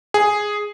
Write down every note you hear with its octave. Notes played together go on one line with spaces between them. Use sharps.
G#4